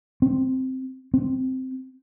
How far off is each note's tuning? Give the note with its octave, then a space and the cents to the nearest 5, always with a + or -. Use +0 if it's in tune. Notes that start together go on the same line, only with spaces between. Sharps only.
C4 -5
C4 -10